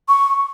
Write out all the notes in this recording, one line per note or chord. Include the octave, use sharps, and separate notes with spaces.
C#6